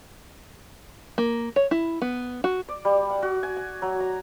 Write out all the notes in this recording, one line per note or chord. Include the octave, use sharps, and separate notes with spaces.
A#3
C#5
E4
B3
F#4
D5
G3
F#5
F#4
G#5
G#5
F#3
A#5